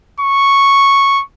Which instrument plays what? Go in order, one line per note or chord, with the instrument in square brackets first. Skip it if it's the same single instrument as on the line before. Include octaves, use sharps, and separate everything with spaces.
[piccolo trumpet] C#6